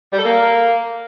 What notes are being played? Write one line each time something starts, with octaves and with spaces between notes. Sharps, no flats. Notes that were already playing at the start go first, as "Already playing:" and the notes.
G3
A4
A#3